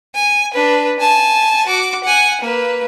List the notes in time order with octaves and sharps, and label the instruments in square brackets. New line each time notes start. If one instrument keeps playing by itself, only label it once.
[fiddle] G#5
D4 B4
G#5 A5
F#4 D6
F#5 G#5
A#3 B4